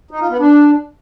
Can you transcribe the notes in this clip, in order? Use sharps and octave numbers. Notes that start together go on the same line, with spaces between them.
D#4
F4
B3
D4